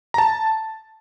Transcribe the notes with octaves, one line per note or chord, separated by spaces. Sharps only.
A#5
A5